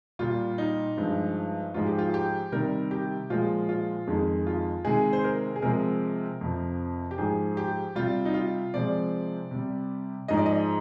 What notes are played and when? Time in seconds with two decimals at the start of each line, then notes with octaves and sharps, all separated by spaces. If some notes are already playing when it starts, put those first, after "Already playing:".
0.19 A#2 G3 F4
0.58 D#4
0.97 G2 F3 G#3
1.74 G#2 F3 G#3 F4
1.87 G4
1.98 F4
2.14 G4
2.52 C3 D#3 G3 A#4
2.91 G4
3.30 A#2 F3 G#3 F4
3.69 F4
4.07 F2 D#3 G#3 G#4
4.47 F4
4.85 C3 D#3 G#3 G#4
5.13 C5
5.24 A#4
5.56 G#4
5.62 C3 F3 G#3 A#4
6.41 F2 C3 F3
7.11 G4
7.18 G#2 F3 G#3 G#4
7.57 G4
7.96 C3 G3 F4
8.25 D#4
8.34 F4
8.74 C3 F3 G#3 D5
9.51 C3 G3
10.28 G#2 F3 G#3 D#5
10.37 D5
10.46 D#5